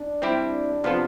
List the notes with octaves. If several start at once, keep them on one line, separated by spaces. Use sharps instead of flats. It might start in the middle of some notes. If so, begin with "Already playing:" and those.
Already playing: D4
G3 C4 E4 G4
C3 F3 B3 F4 A4